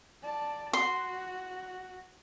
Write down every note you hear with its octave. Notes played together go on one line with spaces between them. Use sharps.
D5 A5
F#4 C6